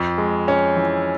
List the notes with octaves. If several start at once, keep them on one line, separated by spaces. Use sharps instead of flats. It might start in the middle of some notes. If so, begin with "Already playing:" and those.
Already playing: F2
G#3
C#4
E3